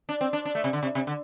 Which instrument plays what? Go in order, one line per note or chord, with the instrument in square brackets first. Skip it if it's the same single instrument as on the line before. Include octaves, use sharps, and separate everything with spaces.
[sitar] D4
C4
D4
D4
A3
C3
D3
C3
C3
D3